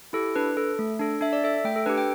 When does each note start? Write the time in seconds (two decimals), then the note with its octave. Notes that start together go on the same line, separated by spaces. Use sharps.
0.13 E4 G4 A4
0.36 D4 B4
0.57 A4
0.79 A3
0.99 D4 A4
1.21 D4 E5
1.33 D5
1.44 A4 E5
1.65 A3 G5
1.76 A4
1.86 D4 G4 B4
1.98 G5